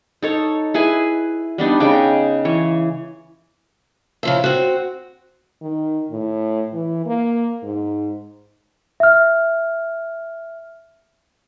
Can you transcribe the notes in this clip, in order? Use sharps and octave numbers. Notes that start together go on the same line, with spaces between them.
D#4 A4 C#5
E4 G#4 B4 G#5
G3 B3 D4 D#4
C#3 G#3 G5
E3 C#5
C#3 F3 E5
C4 F#4
D#3
A2
E3
A#3
G#2
E5 F6